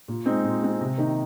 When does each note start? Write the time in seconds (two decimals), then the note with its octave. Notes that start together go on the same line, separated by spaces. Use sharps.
0.08 A#2
0.26 G#3 C4 D#4
0.44 A#2
0.62 G#3 C4 D#4
0.81 C3
0.98 D#3 A#3 D#4